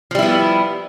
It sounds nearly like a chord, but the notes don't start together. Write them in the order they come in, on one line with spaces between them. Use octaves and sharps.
F3 G3 E4 B3